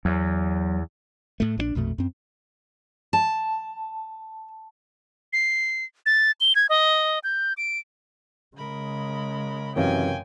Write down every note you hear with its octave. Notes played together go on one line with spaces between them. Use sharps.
E2 F#3
A2 A3
A#1 F3 D4
A#1 F2 B2 A3
F#2 C4
A5
C7
A6
G7
G#6
D#5
G6
D7
C#3 G#3 A#4 B5
F#2 C3 E3 A#4 C#5 F5 G5 G#5